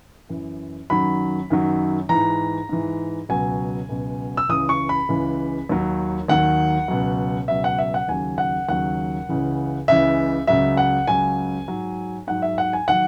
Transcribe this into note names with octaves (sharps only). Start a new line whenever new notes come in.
F#2 E3
F#2 D#3 F#3 B5
F#2 D#3 F#3
G#2 E3 A#5
G#2 E3
C#2 B2 F#3 G#5
C#2 B2 F#3
E6
C#2 C#3 E3 D#6
C#6
B5
C#2 C#3 E3
D#2 D#3 F#3
D#2 D#3 F#3 F#5
C#2 B2 F#3
C#2 B2 F#3 E5
F#5
E5
F#5
D#2 C#3 F#3 G#5
F#5
D#2 C#3 F#3 F#5
C#2 C#3 E3
C#2 C#3 E3 E5
C#2 C#3 F#3 E5
F#5
C#2 C#3 F#3 G#5
G#2 F#3
G#2 F#3 F#5
E5
F#5
G#5
D#3 F#3 F#5